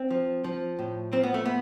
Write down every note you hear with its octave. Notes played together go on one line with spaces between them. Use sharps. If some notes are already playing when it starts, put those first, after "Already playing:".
Already playing: C4
F3
F3
A2
F3 C4
B3
A3
B3